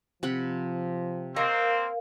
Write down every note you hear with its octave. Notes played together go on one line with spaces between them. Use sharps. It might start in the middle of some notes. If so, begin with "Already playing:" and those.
C3 F3 F#5 B5
A#3 C4 A#4 D#5 F5 A#5 C#6